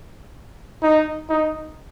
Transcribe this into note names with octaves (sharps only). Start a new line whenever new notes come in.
D#4
D#4